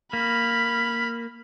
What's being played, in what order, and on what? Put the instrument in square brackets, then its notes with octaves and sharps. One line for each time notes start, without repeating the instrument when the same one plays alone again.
[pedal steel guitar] A#3 [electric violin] B5 F6 [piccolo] B6